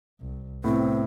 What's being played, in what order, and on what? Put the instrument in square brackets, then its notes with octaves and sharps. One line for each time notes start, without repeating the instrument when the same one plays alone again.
[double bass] C2
[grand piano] A2 [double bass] C3 B3 [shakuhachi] C4